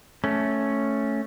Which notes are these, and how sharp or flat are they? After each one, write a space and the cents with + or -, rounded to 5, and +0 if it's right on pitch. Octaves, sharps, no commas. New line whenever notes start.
A3 +0 C#4 +0